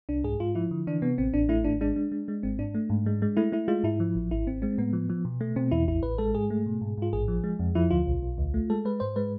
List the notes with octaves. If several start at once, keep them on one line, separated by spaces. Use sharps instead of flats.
C2 D4
G#2 G#4
G#2 F4
F3 E4
D3
E3 D4
C3 B3
A1 C4
A1 D4
A3 E4
G#1 D4
G#3 D4
G#3
G#3
G#3
G#1 C4
G#2 D4
A3
G#2
G#3
G#3
A3 E4
A3 E4
G#3 F4
G#2 E4
F3
A1
G#1 E4
G#1 C4
G#3 C4
A2 B3
F3
F3
B2
A3
B2 C4
E2 E4
A1 E4
A1 B4
G#3 A4
G#2 G#4
A3
B2
G#2
G#2 F4
A1 G#4
F3
G#3
F2
F3 E4
D2 F4
B1
B1
D2
A3
G#3 A4
G#3 B4
G#2 C5
G#3 B4